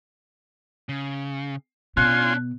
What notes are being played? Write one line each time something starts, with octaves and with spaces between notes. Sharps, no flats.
C#3
B2 C#4 D4 F4 G#5 C6 F#6